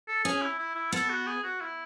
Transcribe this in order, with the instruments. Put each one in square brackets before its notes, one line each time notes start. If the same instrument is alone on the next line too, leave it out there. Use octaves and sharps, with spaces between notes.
[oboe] A4
[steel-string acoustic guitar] C#4 [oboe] G#4
[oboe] E4
E4
E4
[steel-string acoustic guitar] B3 [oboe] A4
[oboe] F#4
G#4
F#4
E4